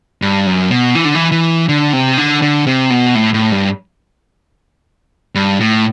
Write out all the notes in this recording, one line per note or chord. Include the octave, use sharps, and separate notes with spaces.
G2
F#2
B2
E3
D3
E3
E3
D3
C3
D3
D3
C3
B2
A2
A2
G2
G2
A2